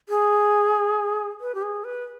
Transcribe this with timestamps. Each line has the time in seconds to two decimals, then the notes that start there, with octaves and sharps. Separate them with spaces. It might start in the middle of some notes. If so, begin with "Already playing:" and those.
0.09 G#4
1.41 B4
1.55 G4
1.62 G#4
1.84 B4